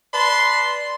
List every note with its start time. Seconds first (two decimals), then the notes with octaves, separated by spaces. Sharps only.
0.13 B4 D5 A5 C6